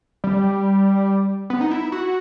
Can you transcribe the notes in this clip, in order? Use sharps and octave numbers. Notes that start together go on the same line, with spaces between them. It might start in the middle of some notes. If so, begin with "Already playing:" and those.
G3
B3
D#4
E4
F#4